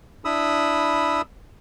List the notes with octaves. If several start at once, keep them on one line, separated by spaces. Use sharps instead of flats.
D4 E4 B5 D#6 E6